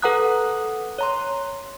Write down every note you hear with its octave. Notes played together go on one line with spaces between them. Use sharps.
A4 B4 F#5 A#5 D#6 F#6
C#5 A#5 C6